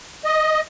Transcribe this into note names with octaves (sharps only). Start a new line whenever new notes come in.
D#5